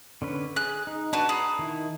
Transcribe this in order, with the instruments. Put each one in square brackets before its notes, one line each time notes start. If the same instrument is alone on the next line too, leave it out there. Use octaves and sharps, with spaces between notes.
[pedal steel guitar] D3 C#4 B4
[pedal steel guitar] G#4 [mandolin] F#6
[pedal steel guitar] D#4
[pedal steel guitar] D4 B4 [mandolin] F#4 A5
[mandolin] G#4 [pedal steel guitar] A#5 B5
[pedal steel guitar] D#3 E4